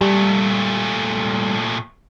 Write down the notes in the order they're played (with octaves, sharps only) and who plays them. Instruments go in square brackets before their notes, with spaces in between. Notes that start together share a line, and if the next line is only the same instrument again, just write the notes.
[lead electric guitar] A#2 A3 [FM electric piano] G3